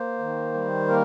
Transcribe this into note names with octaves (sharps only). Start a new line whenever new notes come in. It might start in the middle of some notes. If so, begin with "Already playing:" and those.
Already playing: A#3 C5
D#3
G3
A#3 A#4